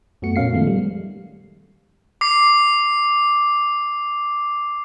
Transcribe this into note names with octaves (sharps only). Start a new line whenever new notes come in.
F#2 A3 B3 F#4 C#7
A#2 A#3 C#4 F5 C7
D#3 F3 G#3 A3 B3
G3
D6 C7